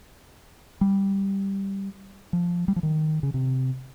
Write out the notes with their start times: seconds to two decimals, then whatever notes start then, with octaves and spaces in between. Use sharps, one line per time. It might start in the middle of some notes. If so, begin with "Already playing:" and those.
0.81 G3
2.33 F3
2.68 G3
2.76 F3
2.83 D#3
3.23 C#3
3.34 C3